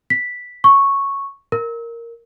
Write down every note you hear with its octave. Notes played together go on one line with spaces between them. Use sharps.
B6
C#6
A#4